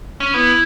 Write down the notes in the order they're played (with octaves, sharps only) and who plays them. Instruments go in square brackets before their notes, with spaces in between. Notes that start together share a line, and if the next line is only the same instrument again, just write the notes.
[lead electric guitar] C#4
[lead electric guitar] B3 [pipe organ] E4